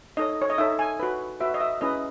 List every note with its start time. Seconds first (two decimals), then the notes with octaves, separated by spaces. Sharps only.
0.17 D#4 A4 C#5 D#5
0.42 C#5
0.50 D#5
0.58 D#4 A4 C#5 E5
0.79 G#5
1.00 F#4 B4
1.40 F#4 B4 E5
1.54 D#5
1.61 E5
1.81 C#4 E4 G#4 B4 D#5